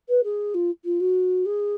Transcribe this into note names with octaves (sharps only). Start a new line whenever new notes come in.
B4
G#4
F4
F4
F#4
G#4